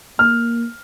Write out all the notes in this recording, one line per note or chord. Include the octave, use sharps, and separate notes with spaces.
A#3 F6